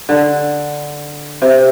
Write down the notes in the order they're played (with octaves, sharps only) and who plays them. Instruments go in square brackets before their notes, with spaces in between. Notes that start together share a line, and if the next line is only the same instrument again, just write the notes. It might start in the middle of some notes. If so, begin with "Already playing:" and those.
[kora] D3
C3